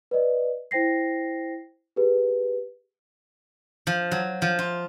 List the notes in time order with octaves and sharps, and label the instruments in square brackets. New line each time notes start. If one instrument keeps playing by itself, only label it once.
[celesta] B4 D5 D#5
E4 C5 G5 A#6 C7
G4 G#4 B4
[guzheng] F3
F#3
F3
F4